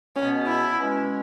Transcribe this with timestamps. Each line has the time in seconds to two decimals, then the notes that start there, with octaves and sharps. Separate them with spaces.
0.16 C#2 B2 B3 C#4
0.47 E4
0.78 B2 G#3 C#4